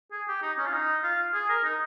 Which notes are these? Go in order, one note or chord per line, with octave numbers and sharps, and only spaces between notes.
G#4
G4
D#4
C#4
F4
D#4
F4
G#4
A#4
D#4